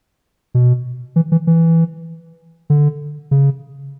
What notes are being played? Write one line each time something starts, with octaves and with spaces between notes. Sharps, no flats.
B2
E3
E3
E3
D3
C#3